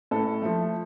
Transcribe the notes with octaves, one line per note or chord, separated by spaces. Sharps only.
A2 A4
F3 A3